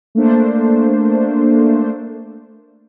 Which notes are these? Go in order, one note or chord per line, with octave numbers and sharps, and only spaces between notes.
A3 A#3 D4 C5